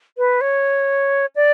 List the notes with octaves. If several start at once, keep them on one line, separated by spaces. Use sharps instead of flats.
B4
C#5
D5